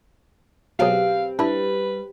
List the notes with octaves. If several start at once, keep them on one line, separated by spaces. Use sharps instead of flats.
B2 F#3 C4 G4 G#4 B4 F5
G3 D4 E4 B4